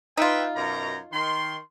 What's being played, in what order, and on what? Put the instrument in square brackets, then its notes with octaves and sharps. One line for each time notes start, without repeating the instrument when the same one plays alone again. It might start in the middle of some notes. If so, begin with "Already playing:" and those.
[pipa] D#4 F4 [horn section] B4 E5 G5
[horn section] F#2 B2 A#5
D#3 C6